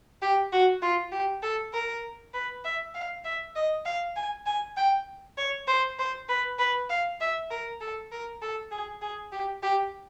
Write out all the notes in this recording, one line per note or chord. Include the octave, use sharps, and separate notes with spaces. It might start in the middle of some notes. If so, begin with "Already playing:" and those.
G4
F#4
F4
G4
A4
A#4
B4
E5
F5
E5
D#5
F5
G#5
G#5
G5
C#5
C5
C5
B4
B4
F5
E5
A#4
A4
A#4
A4
G#4
G#4
G4
G4